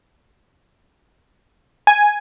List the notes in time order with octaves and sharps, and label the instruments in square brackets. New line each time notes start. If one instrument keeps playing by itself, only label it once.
[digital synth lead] G#5